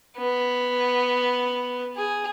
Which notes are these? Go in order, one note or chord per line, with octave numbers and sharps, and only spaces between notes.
B3
G#4